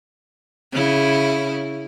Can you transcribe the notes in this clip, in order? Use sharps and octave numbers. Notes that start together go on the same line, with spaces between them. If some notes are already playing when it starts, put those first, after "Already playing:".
C#3 E4